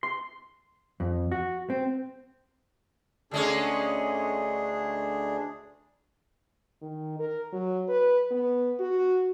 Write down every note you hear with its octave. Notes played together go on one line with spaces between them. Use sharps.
C6
F2
F#4
C4
D2 D3 G#3 C#4 D4 G#4
D#3
A#4
F#3
B4
B3
F#4